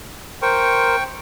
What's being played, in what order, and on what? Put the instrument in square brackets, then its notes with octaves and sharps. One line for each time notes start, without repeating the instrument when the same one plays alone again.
[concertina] A#4 C5 [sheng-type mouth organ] G5 C#6